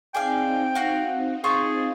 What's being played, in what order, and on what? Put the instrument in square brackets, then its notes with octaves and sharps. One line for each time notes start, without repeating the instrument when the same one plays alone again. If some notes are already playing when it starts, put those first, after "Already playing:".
[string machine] C4 D#4 [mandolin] G#4 D5 F5 [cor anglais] G5
[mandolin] F#4 F5
[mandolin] F4 C5 C#6 [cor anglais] G#4